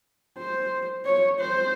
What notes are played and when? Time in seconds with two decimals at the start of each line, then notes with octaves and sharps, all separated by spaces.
0.38 C5
1.06 C#5
1.40 C5